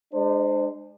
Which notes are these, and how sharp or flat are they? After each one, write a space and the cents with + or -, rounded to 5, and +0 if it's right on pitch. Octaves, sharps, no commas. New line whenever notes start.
G#3 +0 D4 +40 C5 -15